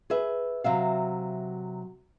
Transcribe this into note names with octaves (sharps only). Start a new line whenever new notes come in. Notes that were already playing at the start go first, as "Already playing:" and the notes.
G#4 B4 E5
C3 F#3 E5 F5